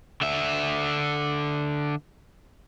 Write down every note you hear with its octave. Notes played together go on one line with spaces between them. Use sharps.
D3 E5